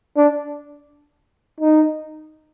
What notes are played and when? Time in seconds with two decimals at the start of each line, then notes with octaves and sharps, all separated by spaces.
0.17 D4
1.60 D#4